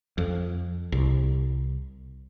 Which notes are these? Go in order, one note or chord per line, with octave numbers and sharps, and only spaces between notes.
F2
C2